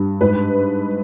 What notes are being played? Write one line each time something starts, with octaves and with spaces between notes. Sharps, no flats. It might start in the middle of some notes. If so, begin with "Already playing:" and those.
Already playing: G2
G#2 B4